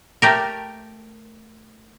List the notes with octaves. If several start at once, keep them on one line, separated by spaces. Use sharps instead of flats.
A3 G4 A#4